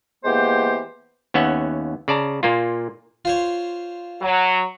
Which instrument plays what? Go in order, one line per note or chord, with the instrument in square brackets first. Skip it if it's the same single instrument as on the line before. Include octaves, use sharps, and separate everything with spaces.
[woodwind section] E3 G#3 A#3 B3 G4 C5
[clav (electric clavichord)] D#2 B3 C#4 E5 F#5
C#3 D5 A5 A#5
A#2 A#3 F4
[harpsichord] F4 C5 C#5
[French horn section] F#3